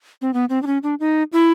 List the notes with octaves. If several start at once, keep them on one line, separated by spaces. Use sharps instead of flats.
C4
B3
C4
D4
C#4
D4
D#4
E4